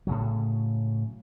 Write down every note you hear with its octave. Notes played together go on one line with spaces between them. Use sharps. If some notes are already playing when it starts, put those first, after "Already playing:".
A2 C#3 F#3